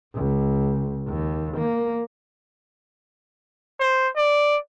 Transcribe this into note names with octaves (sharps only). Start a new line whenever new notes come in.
C#2
D#2
A#3
C5
D5